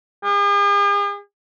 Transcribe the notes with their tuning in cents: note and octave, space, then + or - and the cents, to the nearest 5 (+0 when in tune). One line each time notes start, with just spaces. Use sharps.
G#4 -45